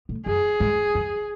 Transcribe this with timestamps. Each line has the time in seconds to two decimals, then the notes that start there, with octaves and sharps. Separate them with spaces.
0.09 A2
0.26 F#2 G#4
0.60 G#2
0.95 F#2